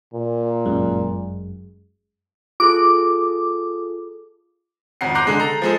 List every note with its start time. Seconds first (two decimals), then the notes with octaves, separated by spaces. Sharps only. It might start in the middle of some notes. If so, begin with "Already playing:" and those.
0.14 A#2
0.65 G1 F#2 G#3
2.60 F4 G#4 A4 D6
5.01 G#1 F2 F#5 C7
5.15 A#5 C6 D6 F#6 G6 C7
5.27 D3 G#3
5.39 A4 A#5
5.62 F3 G#3 A4